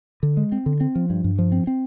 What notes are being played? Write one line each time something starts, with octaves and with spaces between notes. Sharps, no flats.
D3
G#3
C4
D3
C4
F3
G2
G2
F3
C4
C4